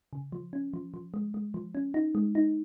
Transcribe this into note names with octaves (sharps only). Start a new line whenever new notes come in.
C#3
F3
C#4
F3
F3
G#3
G#3
F3
C#4
D#4
G#3
D#4